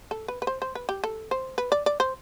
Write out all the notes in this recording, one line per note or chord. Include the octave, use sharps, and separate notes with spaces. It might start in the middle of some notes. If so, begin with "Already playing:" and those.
A4
B4
B4
C5
C5
B4
G4
A4
C5
B4
D5
D5
C5